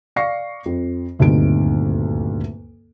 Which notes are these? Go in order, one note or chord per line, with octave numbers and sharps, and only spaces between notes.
D5 F5 C#6 A#6 C7 C#7
F2
D#1 D2 G2 C4 D#4 D7